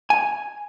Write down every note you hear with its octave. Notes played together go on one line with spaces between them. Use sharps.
G#5